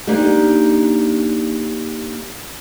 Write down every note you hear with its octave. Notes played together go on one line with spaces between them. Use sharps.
A#3 D4 D#4 G4